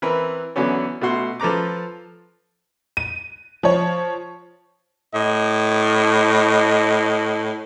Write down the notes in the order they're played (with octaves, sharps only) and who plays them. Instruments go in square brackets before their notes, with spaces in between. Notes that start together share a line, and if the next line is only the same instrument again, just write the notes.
[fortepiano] E3 C4 A#4 B4
D3 E3 F#3 B3 C#4
B2 A3 F#4 C6
F3 A4 B4 A#5 D6
[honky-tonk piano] D#7
F3 C#5
[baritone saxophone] A2 [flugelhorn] D#5